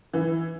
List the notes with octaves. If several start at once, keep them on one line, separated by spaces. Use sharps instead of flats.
E3